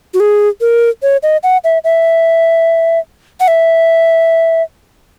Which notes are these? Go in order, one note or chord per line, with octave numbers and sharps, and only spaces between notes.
F#4
G#4
A#4
C#5
D#5
F#5
E5
E5
F#5
E5